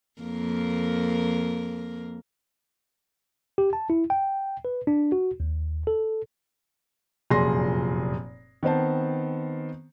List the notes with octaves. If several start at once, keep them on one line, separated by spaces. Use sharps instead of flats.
F2 A#3 A#4
G4
A5
E4
G5
B4
D4
F#4
D#2
A4
F1 F#2 A#2 G#4 C6 A#6
D#3 B3 C4 C5 A5